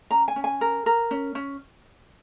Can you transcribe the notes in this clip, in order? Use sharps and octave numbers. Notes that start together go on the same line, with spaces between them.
C#4 A#5
G#5
C#4
G#5
A#4
A#4
C#4
C#4